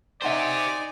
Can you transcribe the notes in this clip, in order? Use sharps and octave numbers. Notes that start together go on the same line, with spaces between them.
D#4 G4 C5 D5 E5 F#5 G#5 C6